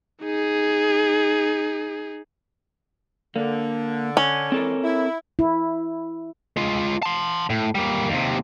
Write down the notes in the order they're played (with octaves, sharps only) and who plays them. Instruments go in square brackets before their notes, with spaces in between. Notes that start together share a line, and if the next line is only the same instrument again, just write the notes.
[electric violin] D#4 G#4
[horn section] D3 [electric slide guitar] A#3
[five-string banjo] C#4
[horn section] E3 G#3 D5 [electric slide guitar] C4 A4 A#4
[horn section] E4
[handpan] E4
[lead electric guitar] G#3 F4
A5 C6
A2
G3 A#3
D#2 C3